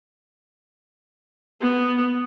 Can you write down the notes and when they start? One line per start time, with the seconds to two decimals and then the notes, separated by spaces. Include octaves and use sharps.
1.61 B3